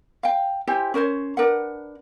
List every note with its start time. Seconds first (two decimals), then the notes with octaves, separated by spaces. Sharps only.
0.23 F5 G5
0.67 E4 G4 C5 G#5
0.94 C#4 A#4 C5 C#5
1.37 D4 A#4 B4 F#5